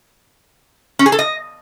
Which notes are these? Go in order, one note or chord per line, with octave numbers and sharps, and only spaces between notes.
C#4
G#4
A4
D#5